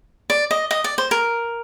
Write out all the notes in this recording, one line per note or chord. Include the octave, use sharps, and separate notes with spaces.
D5
D#5
D#5
D5
C5
A#4